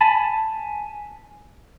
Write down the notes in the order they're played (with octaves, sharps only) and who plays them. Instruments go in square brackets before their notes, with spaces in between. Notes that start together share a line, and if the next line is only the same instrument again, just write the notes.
[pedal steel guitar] G#5 A5 B5